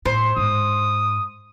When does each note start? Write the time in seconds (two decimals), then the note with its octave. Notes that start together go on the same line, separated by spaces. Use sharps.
0.05 A2 C5
0.37 G#2 D#6